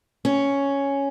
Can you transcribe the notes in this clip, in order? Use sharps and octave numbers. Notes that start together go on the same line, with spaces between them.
C#4